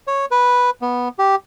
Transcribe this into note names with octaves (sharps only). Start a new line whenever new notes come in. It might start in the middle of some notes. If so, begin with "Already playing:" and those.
C#5
B4
B3
G4